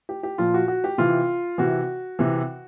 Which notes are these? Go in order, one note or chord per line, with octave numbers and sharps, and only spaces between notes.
G4
G4
A#2 F3 F4
F#4
F#4
G4
C3 E3 F4
C3 E3 F#4
C3 E3